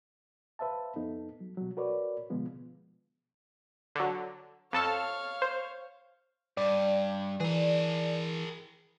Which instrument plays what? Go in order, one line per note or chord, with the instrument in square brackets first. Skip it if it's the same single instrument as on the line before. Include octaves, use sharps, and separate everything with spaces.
[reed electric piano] B4 C5 E5 F5 A5
F2 B3 D#4 A4
F#3
B2 F#3
F#4 A#4 B4 C#5 D5
B2 D3 F3 G#3 B3 F4
[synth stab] D3 F#3
[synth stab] F2 A4 A5 [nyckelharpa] C#5 F5
[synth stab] C5
[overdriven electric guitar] G2 [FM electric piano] D5
[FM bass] E3 [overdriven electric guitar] G#4 A#4